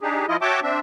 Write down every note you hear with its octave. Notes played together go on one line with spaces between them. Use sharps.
D4 D#4 G4 G#4
F3 E4 F4 D#5
F#4 C#5 E5 G5 A5 D6
C4 D4 E5